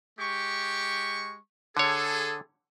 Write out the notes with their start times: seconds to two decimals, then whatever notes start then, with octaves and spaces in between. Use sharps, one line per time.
0.19 G#3 G4 C#6
1.77 D3 G#4 A4 C#5